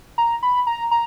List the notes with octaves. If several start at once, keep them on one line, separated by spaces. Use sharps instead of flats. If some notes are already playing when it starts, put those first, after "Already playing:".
A#5
B5
A#5
A#5